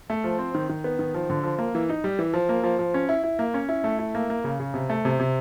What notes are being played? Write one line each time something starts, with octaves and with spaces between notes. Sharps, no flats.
A3
F3
C4
D#3
D#3
B3
D#3
F3
D3
F3
A#3
E3
D#4
G3
E3
F3
A#3
F3
F3
C#4
E4
E4
A#3
C#4
E4
A3
E4
A#3
A#3
C#3
C#3
C3
A3
C3
C3